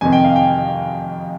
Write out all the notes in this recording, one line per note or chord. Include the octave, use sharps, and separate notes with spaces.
F2 C3 D#3 G#5
G5
F5
G5